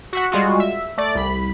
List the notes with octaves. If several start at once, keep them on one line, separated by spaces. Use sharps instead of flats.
F#4 E5 F#5
G3 G#3 F4 F#4
E5
A3 D5
C2 B5